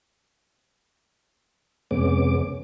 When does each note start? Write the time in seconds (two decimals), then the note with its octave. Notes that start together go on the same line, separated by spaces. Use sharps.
1.91 F2 C3 G#3 B3 C#4 D6